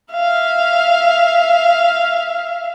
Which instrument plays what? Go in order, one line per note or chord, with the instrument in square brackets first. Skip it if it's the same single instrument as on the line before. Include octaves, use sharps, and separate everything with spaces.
[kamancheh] E5 F5